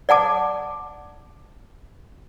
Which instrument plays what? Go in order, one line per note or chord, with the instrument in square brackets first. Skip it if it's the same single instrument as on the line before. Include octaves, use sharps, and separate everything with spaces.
[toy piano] D5 F#5 A5 D6